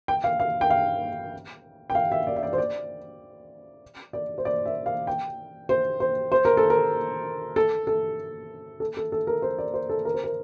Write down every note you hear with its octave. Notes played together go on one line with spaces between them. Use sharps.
G5
F5
F5
G5
F5
G5
F5
E5
D5
E5
D5
C5
D5
D5
C5
D5
E5
F5
G5
C5
C5
C5
A#4
A4
A#4
A4
A4
A4
A4
A4
A#4
C5
D5
C5
A4
A#4
C5
A#4